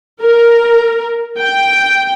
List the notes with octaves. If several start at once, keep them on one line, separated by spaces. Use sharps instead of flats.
A#4
G5